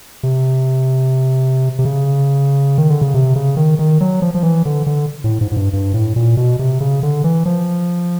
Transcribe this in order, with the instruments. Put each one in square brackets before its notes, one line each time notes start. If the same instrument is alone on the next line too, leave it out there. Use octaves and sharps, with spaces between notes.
[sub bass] C3
C3
C#3
D#3
D3
C#3
C3
C#3
D#3
D#3
F#3
F3
F3
E3
D3
D3
A2
G#2
G#2
G2
G2
A2
A#2
B2
C3
C#3
D3
E3
F3